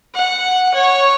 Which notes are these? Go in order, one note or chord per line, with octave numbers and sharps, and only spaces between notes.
F#5
C#5